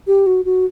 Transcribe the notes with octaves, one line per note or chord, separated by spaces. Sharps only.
G4
F#4
F#4